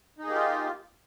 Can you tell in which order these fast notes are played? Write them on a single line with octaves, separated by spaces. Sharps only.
D#4 G#4 A#3 G4 F4